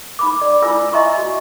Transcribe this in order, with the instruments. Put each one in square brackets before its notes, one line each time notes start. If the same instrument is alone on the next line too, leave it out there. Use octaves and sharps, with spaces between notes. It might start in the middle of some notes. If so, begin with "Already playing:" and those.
[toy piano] D#4 B5 D6
D5
D4 E4 F4 G#5 E6
D#5 E5 G#5 A#5 C6 C#6
F#4